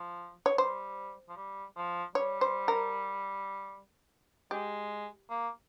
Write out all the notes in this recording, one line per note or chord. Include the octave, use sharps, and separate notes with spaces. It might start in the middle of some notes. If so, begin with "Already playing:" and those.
Already playing: F3
C#5
G3 C5
F3
G3
F3
G3 C#5
C5
A#4
G#3 G4
A#3